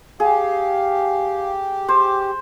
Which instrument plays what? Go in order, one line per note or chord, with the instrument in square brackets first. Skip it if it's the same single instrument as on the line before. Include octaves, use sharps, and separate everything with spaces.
[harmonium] G4 [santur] G#4 [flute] F5
[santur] C5 [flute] D6